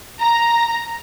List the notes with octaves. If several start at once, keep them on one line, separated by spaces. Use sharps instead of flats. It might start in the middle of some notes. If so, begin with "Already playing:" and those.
A#5